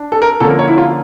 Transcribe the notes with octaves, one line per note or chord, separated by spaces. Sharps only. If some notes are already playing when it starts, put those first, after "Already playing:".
Already playing: D4
A4
A#4
D3 F3 A#3 C#4 A4
A#4
C#5
E4
F4